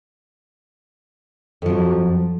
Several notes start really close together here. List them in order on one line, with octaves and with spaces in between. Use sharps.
F2 F3 F#3